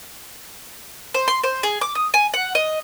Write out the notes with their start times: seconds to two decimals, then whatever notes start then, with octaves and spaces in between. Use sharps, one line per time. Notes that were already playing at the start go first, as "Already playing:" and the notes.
1.14 C5
1.28 C6
1.44 C5
1.63 G#4
1.81 D6
1.95 D#6
2.14 G#5
2.34 F#5
2.55 D#5